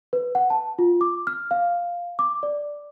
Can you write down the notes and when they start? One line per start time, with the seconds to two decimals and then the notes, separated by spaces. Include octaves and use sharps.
0.13 B4
0.35 F#5
0.50 A5
0.79 F4
1.01 D6
1.27 F6
1.51 F5
2.19 D6
2.43 D5